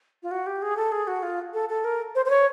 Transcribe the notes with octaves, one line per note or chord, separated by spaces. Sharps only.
F4
F#4
G4
G#4
A4
G#4
F#4
F4
A4
A4
A#4
C5
C5
C#5